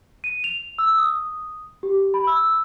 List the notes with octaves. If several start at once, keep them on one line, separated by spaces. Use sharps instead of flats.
D#7
F7
E6
D#6
G4
B5
E6